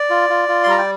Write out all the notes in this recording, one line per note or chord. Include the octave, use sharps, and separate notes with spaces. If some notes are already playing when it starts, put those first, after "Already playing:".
Already playing: D5
F4
F4
F4
C6
G3 A#5
G5